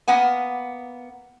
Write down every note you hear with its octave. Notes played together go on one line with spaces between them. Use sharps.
A#3 B3 F#5 G#5